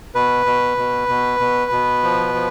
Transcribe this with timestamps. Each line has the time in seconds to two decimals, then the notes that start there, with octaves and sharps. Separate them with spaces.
0.15 B2 B4
0.46 B2
0.78 B2
1.09 B2
1.40 B2
1.71 B2
2.03 F3
2.34 F3